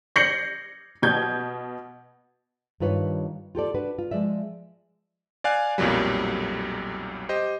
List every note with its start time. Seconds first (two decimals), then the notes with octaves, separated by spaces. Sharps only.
0.16 G6 A#6 C7 C#7 F#7
1.02 B2 G6 G#6
2.80 G2 D#3 F4 B4 C#5
3.55 F4 G4 A4 D5
3.74 D4 F#4 B4
3.99 F4
4.11 F3 G#3 D5 E5
5.44 D5 F5 G#5 F#6
5.78 B1 F2 A#2 F#3 G3
7.29 G4 C5 D#5